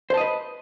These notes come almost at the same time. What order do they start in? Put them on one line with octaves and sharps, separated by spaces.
C5 A5 D#5 B4